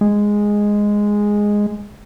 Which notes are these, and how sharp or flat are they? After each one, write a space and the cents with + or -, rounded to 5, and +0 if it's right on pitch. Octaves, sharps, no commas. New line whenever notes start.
G#3 -5